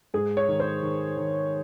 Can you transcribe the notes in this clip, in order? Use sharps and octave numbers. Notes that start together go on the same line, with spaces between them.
G#2 G#4
C#5
D#3
C5
D#3
D#3